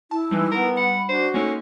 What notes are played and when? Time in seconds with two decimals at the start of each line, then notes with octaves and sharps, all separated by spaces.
0.11 E4 A5
0.31 E3 G3 G#3 D#4
0.52 B3 A#4
0.77 F#5 B5
1.09 D4 F#4 C5
1.34 G#3 A#3 C#4 D#4 A4